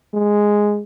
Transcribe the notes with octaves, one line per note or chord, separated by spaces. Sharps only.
G#3